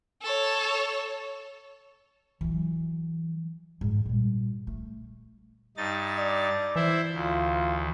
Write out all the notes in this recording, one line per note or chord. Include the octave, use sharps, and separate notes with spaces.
A4 C#5
E3 F#3
G#2
A#2 G3
A3
G2 D#4 A6
D5
E3 E4 C5 E5
D2 F4